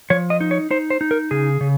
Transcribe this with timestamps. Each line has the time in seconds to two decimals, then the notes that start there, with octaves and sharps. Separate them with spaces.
0.10 F3 C#5
0.30 D#5
0.41 D#4
0.51 C#5
0.71 D#4 C5
0.90 C5
1.01 D#4
1.11 A#4
1.31 C#3 G#4
1.61 C#3